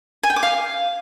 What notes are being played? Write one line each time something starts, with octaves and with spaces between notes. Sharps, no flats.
G#5
G5
D6
F5